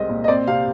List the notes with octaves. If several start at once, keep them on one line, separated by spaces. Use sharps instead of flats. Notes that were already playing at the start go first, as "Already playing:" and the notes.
Already playing: C2 G#3 C4 D#5
A#2
D#5
C4 D5
C3 F5